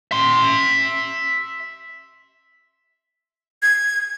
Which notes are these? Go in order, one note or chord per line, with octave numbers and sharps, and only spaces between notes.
E5 C6
G#6